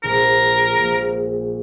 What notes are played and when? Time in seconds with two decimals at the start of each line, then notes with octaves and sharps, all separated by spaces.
0.03 A#1 A#2 G#3 A#4
0.79 A#1 A#2 G#3